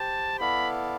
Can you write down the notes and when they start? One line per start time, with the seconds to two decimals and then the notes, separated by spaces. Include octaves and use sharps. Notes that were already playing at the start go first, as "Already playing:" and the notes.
Already playing: G4 C5 G5 A5
0.39 B3 E4 A4 D5 F5 B5